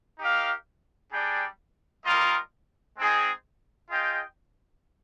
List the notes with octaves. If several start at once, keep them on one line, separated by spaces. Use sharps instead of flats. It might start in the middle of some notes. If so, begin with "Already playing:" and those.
D#4 G4 A#4 F5
G3 D4 G#4 D5 G5
G3 A#3 F4 A#4 D#5
G#3 C4 D#4 G#4
F4 G#4 D#5 G5